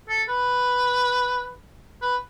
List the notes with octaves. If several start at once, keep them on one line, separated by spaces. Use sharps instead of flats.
A4
B4
B4